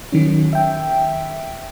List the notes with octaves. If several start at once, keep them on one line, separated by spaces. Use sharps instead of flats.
D#3 F#3 C#4
E5 G5